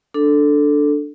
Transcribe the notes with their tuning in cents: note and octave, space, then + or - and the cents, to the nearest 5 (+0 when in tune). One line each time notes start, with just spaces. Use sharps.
D4 +0 A4 +0